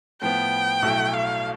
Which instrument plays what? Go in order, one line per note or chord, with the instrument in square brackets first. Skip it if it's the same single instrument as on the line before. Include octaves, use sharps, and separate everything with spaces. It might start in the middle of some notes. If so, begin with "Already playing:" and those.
[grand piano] A2 F3 B3 [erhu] G5
[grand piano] B1 B2 A3 E4
[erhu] F5